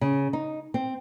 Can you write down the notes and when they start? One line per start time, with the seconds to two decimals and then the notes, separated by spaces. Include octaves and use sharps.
0.01 C#3
0.33 D#4
0.74 C4